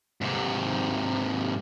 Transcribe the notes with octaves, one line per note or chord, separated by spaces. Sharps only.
G#2 C3